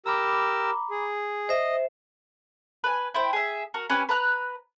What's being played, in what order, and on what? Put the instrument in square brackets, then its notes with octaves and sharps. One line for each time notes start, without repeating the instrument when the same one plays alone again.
[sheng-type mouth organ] G4 A#4 E6 [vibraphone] A#5 B5 D6
[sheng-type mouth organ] G#4
[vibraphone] C5 E5 [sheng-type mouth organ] D#5
[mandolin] B4 G#5
E4 C5 G5
G#4 E5
F#4 A#4
C#4 G4 B4 G#5
B4 A#5 F#6